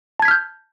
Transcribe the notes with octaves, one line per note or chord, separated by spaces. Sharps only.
A5 F6 G6 G#6 B6